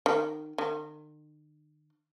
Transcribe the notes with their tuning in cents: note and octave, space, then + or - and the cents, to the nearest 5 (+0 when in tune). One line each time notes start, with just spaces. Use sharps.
D#3 -25
D#3 -45